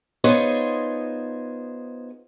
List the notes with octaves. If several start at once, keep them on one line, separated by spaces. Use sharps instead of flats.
B3 D#4 F4 G#4 C5 C#5